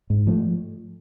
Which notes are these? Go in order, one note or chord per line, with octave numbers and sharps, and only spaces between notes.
G#2
F3 A3